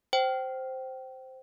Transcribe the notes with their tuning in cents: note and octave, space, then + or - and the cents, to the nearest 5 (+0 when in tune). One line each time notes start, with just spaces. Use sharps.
C5 +0 G5 -25